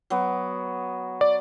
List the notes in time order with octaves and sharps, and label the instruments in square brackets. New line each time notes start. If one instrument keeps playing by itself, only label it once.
[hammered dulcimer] F#3 B3
[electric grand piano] D5